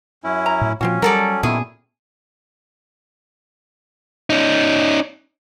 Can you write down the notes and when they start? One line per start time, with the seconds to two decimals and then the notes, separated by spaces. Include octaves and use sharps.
0.24 F#2 C#4 E4
0.46 A#5
0.61 A2
0.81 A#2 F3 C4 C#4 F4 F#4
1.02 F#3 G3 A4 A#4 D5
1.43 A#2 D#3 B3 C#4 E4 G#4
4.30 C#4 D#4